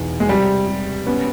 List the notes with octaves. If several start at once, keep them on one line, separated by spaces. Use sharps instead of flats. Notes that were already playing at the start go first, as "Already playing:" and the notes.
Already playing: E2 B2 D#4
G#3
C3 G3
C3
B3 C#4